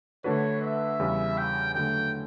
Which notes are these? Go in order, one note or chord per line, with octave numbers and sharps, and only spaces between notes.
D3 A3 D4 F#4 B4 C#5
E5
E2 C#3 G3
G5
D3 F#3 A3 G5